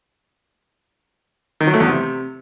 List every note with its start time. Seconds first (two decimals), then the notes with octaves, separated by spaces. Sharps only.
1.60 D#3
1.67 F#3
1.74 A3
1.80 E2
1.87 C3